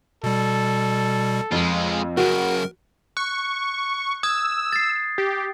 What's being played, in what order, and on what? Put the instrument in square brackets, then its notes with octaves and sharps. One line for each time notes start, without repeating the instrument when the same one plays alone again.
[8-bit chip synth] B2 G3 [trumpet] A4
[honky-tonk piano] F2 [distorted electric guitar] G#3 F4
[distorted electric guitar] F#2 C#3 [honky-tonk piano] F#4 [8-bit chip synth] A#4
[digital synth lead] C#6 [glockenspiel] F#6
[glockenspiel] D#6 G#6 [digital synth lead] E6
[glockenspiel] A6 C7
[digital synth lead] G4